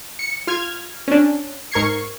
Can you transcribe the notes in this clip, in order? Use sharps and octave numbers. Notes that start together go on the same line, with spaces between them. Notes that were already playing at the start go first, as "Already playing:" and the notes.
C#7
F4 F6 G#6
C#4 D4
G#2 A#4 C#6 G#6 C7 C#7